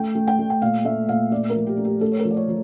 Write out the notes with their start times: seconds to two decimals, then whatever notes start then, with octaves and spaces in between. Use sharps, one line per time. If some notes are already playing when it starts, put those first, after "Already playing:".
Already playing: A3 G5
0.15 A3
0.28 G5
0.39 A3
0.50 G5
0.62 A#2 F5
0.85 A3 E5
1.09 A#2 F5
1.31 A3 D5
1.50 A#4
1.55 F3
1.66 G4
1.78 A3
1.85 G4
2.01 A3 A4
2.12 C#5
2.19 A#4
2.25 F3
2.31 D5
2.37 C#5
2.48 F3